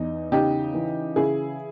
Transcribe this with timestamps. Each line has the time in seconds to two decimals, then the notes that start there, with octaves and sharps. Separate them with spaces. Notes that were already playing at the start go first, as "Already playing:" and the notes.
Already playing: E2 D#4
0.32 C#3 D#4 G4
0.74 E3
1.16 C#3 E4 G#4